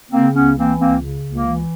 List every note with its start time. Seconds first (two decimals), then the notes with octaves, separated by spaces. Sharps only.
0.11 C#3 A#3 C4
0.34 C#2 B3 C#4
0.56 E3 A#3 C4
0.79 C#2 A#3 C4
1.02 C#3
1.24 C#2
1.32 A#3
1.46 E3